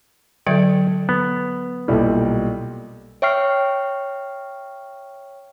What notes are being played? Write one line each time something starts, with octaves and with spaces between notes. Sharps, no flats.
D3 F#3 A4 D5 E5 G5
B3
B1 A#2 G3 E4 A4
C#5 E5 G5 C#6 F6 C7